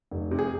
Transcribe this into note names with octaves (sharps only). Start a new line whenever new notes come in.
F1
C3
G#4